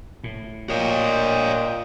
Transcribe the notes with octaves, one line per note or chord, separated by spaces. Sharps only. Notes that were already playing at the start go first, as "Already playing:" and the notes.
A2
A#2 A#4 C#5 D#5 G5